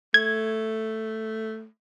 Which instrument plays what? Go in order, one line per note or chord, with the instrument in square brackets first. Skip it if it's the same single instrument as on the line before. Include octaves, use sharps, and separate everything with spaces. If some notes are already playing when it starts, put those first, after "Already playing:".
[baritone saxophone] A3 [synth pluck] G#6